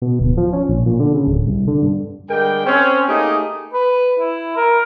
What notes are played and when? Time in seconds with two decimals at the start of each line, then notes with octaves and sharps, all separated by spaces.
0.02 B2
0.19 D1
0.37 F3
0.53 C#4
0.68 A#1
0.86 A#2
1.00 D3
1.14 C#3
1.27 D1
1.46 C2
1.68 D3
1.82 G2
2.30 D3 G3 G#3 A#4 G5
2.66 C4 C#4
3.09 A3 A#3 D#4 G4 G#4
3.74 B4
4.19 E4
4.57 A#4